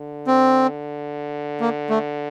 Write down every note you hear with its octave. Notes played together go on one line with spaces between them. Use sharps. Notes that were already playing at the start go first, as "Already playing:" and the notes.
Already playing: D3
C4
A#3
A3